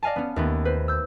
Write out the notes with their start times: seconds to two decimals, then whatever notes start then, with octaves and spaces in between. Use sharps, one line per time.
0.03 D5 D#5 F5 G#5 A5
0.16 B3 C#4
0.36 D#2 A3 B3
0.65 B4 C5
0.88 E6 G6